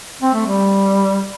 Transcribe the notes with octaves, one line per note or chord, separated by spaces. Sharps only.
C4
A3
G3